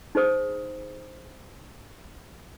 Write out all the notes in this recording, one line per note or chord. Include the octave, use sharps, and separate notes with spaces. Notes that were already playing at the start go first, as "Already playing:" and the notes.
D#4 G#4 C5 D#6